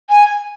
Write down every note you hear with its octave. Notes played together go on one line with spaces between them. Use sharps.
G#5